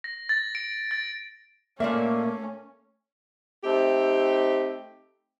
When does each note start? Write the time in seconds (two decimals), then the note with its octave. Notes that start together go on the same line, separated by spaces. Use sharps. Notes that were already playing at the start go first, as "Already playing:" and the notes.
0.04 A#6
0.29 A6
0.55 D7
0.91 A6
1.80 A#2 A3 A#3 C#4 D5 E5
3.64 A3 C4 D#4 G4